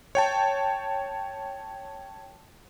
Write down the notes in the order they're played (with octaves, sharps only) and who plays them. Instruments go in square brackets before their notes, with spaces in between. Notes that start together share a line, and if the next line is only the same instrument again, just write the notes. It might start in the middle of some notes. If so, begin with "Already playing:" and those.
[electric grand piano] C#5 G5 A5